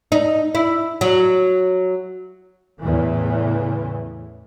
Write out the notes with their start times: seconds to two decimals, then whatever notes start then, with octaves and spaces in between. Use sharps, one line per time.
0.12 D#4
0.55 E4
1.01 F#3
2.82 E2 A2 C#3 E3